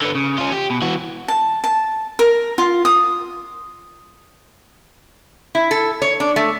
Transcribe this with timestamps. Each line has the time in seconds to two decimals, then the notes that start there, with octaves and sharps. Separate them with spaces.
0.02 D3 B3
0.15 C#3
0.38 C#4 F4
0.52 G4
0.70 B2
0.82 E3 F#4
1.28 A5
1.64 A5
2.19 A#4
2.58 F4
2.85 D#6
5.55 E4
5.71 A4
6.02 C#5
6.20 D4
6.36 A3